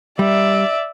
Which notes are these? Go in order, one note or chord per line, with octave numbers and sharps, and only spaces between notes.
G3 D5 E5